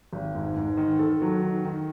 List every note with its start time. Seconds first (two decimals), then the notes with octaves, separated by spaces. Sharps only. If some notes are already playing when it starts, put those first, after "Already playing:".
0.13 G#1
0.35 G#2
0.56 G#2
0.77 D#3
0.99 D#3 A4
1.22 F#3
1.42 D#3
1.65 D#3